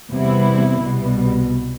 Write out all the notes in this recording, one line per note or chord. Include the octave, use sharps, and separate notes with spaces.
E2 C3 G3 B3 E4
C2 B2 G3 B3